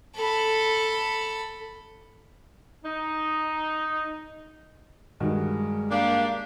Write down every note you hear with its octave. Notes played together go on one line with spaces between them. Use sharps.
A4 B5
D#4
G2 D#3 G#3 F#4
A#3 D4 G4 F5